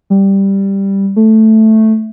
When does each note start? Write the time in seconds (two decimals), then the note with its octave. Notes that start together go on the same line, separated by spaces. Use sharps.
0.10 G3
1.16 A3